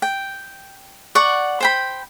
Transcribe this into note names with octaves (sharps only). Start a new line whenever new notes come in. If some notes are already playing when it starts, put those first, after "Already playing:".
G5
D5 F#5 C#6
C5 G5 B5